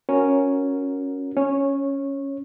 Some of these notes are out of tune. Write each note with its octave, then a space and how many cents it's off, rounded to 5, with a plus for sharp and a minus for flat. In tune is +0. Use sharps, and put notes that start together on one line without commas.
C#4 +0 F#4 -20 A#4 +0
C#4 +0 C#5 -15